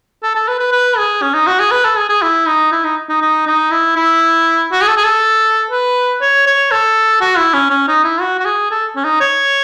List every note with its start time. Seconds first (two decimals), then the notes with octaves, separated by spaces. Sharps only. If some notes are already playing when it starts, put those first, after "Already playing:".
0.23 A4
0.36 A4
0.48 B4
0.60 B4
0.72 B4
0.98 G#4
1.22 C#4
1.34 D#4
1.47 F#4
1.60 G#4
1.72 B4
1.85 A4
1.97 G#4
2.09 G#4
2.22 E4
2.46 D#4
2.72 E4
2.84 D#4
3.09 D#4
3.22 D#4
3.47 D#4
3.71 E4
3.96 E4
4.72 F#4
4.82 G#4
4.88 A4
4.97 G#4
5.04 A4
5.71 B4
6.21 C#5
6.47 C#5
6.71 A4
7.21 F#4
7.38 E4
7.54 C#4
7.70 C#4
7.88 D#4
8.04 E4
8.21 F#4
8.39 F#4
8.45 G#4
8.71 A4
8.96 C#4
9.04 D#4
9.20 C#5